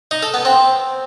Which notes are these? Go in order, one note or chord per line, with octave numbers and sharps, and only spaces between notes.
D#4
A4
B3
C4